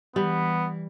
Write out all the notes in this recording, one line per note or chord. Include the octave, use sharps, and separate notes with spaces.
E3 G3 B3